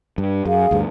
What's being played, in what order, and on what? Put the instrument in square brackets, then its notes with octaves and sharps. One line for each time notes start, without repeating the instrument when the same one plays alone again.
[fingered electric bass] G2
[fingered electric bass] F#2 [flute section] G#4 F5
[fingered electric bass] D2 G2